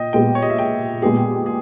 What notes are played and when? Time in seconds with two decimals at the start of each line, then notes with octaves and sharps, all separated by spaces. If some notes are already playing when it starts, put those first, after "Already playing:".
Already playing: A#2 D#5 G5
0.13 A#2 G#3 B3 G4 G5
0.35 C#5
0.42 D#5
0.50 E5
0.58 G5
1.02 A#2 G#3 B3 G4 G#4
1.46 G#4